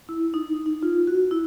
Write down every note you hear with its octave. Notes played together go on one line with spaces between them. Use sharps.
E4
D#4
D#4
F4
F#4
E4